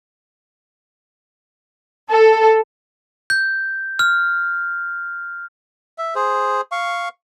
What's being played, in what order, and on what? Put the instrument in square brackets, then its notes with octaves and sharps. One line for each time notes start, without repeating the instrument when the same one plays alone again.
[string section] A4
[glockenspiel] G6
F6
[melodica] E5
G#4 C5
F5 C#6